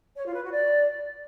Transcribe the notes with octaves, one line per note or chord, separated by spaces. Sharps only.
C#5
F4
B4
F#4
D5